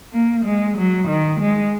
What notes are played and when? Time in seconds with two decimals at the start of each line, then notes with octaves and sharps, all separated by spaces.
0.13 A#3
0.45 G#3
0.77 F#3
1.08 D#3
1.40 G#3